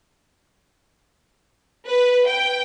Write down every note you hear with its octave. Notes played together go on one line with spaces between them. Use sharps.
B4
G5